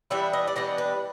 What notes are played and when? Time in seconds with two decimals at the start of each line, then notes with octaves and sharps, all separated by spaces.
0.10 E3 G3 B3 D4 E5
0.33 D#5
0.48 D5
0.56 E3 G3 B3 D4 D#5
0.78 B4